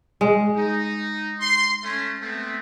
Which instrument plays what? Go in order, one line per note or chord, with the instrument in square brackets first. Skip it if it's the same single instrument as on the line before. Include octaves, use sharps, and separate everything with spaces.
[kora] G#3
[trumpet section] D#4
C6
A3 C#4
A3 B3 C4